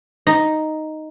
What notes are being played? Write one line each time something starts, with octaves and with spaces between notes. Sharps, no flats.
D#4